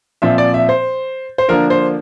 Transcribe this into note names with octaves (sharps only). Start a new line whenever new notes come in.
A#2 F3 C4 E5
D5
E5
C5
C5
D3 F3 A#3 D4 A#4
C5